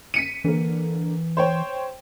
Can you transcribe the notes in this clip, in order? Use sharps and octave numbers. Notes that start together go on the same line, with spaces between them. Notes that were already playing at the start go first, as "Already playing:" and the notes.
B6 C#7 D#7
D3 E3 A#3
C5 C#5 G5